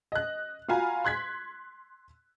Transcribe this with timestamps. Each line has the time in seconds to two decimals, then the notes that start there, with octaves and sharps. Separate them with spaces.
0.12 D#5 F#6
0.69 F4 F#4 F5 G#5 A#5 B5
1.05 C6 F#6 G#6 B6